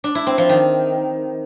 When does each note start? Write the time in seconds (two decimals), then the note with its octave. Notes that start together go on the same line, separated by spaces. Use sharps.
0.04 D4
0.15 E4
0.27 C4
0.38 F3
0.49 D#3